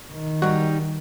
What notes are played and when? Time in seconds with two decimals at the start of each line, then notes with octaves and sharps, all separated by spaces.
0.13 D#3
0.42 G3 D#4 F#4